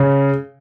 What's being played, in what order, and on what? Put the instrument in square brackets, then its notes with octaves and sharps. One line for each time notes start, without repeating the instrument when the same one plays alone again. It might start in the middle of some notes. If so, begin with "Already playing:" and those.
Already playing: [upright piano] C#3